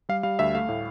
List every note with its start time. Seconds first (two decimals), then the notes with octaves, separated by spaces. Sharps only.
0.09 G3 F5
0.23 G3 F5
0.39 D2 E5
0.54 A3 F5
0.69 A2